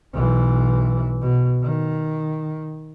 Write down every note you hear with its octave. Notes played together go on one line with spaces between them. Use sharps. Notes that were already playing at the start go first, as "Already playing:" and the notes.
B1 E3
B2
D#3